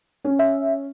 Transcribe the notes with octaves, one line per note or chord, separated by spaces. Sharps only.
C#4
E5